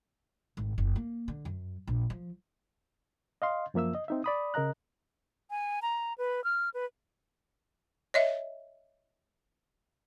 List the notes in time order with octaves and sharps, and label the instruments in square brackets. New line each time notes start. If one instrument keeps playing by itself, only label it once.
[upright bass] G#1
F#1
A#3
D3
F#2
A#1
F3
[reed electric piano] D#5 F5 C6
F#2 F3 A#3 E5 E6
D#5
C4 D#4 E5
D5 B5 D#6
C#3 A#4 D#5 A#5 F#6
[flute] G#5
A#5
B4
F6
B4
[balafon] C#5 D#5 E5